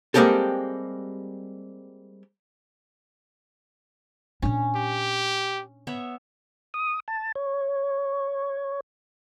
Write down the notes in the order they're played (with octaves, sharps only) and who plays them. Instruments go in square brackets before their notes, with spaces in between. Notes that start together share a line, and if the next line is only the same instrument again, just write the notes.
[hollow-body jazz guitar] G3 G#3 A#3 C4 G4 A4
[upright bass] A#2 D4 [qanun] C#4
[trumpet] G4
[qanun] B3 C#5 E5
[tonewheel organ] D#6
A5
C#5